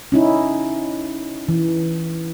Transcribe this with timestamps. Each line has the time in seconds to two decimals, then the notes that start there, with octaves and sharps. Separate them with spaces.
0.12 C#4 D#4 E4
1.49 E3